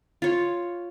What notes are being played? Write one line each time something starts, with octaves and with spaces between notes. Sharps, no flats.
F4 C#5